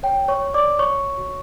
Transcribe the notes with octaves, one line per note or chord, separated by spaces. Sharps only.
C#5 G5
C#5 C#6
C#5
D5 D6
C#5 C#6
F#4